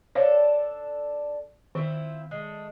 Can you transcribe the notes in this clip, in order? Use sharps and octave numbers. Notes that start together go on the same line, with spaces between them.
D4 A4 C5 C#5 F5
D#3 C4 E4 F4
G#3 A3